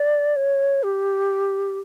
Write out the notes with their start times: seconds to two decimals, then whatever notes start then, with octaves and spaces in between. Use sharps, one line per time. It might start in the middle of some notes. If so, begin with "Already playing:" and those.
Already playing: D5
0.36 C#5
0.83 G4